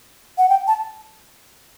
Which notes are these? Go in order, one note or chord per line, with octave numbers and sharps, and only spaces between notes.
F#5
G5
A5